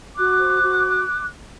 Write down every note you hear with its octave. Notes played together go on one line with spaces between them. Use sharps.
F#4 D6 F#6
C5
F#4